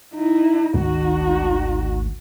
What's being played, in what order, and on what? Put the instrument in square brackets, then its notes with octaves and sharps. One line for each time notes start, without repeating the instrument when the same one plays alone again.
[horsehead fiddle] D#4 E4
[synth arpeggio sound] G#1 D2 [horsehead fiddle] D#4 F#4